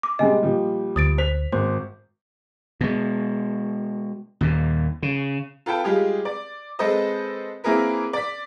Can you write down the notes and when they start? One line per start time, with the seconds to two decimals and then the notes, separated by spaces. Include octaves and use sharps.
0.03 D6
0.19 C3 G3 G#3 D#5 G#5
0.43 A#2 F3 G3
0.96 D2 D#6 A6 D7
1.18 C5 B6 F7
1.52 G#1 C5 C6
2.81 B2 G#3
4.41 D#2 A#2
5.03 C#3
5.66 F4 A4 B4 G5 A5
5.84 G3 G#3 F4 G4 G#4
6.25 D5
6.79 G#3 C4 A4 B4 C5 D#5
7.64 A#3 C4 E4 G#4 A#4 B4
8.13 D5 B6